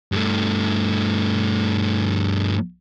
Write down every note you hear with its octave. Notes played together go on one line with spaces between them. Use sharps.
G2 A3